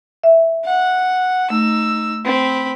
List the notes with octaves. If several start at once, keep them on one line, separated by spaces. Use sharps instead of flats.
E5
F#5
A3 D#4 E6
C4 B5